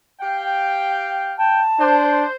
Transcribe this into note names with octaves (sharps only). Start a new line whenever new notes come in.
G4 F5 G5
G5 A5
D4 C5